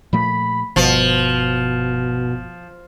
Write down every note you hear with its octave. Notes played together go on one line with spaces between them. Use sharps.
A#2 F3 A3 B5
G1 B2 F3